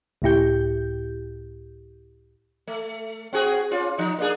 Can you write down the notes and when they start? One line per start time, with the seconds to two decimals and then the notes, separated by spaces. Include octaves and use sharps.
0.22 C#2 A2 E4 G4 G6
2.67 A3
3.33 C4 F#4 G#4
3.71 C#4 F4
3.98 F3 D#4
4.19 A#3 D4 G#4